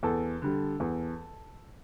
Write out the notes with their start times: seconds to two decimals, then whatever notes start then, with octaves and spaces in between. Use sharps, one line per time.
0.03 E2 A4
0.42 D3 G3
0.80 E2